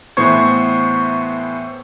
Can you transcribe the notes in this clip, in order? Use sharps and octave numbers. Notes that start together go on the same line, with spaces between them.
A2 E3 B3 C5 C#6 G#6